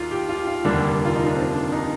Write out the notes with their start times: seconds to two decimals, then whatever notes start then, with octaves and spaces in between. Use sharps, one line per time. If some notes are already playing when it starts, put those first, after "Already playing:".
Already playing: D#2 D#3 F4
0.11 G4
0.29 F4
0.47 F4
0.65 F1 D#2 D3 G3 A#3 D4
1.05 F4
1.15 D#4
1.26 D4
1.36 C4
1.54 D4
1.72 D#4